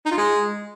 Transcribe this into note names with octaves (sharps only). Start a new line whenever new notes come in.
D#4
F4
G#3